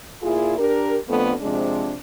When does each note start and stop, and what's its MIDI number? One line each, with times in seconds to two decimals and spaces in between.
0.23 0.55 46
0.23 0.55 64
0.23 0.55 65
0.23 0.55 68
0.58 0.96 62
0.58 0.96 67
0.58 0.96 70
1.08 1.32 41
1.08 1.32 50
1.08 1.32 57
1.08 1.32 59
1.41 1.95 48
1.41 1.95 53
1.41 1.95 56
1.41 1.95 62